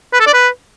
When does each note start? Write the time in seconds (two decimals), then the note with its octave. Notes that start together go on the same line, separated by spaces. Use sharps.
0.13 B4
0.20 A4
0.27 D5
0.34 B4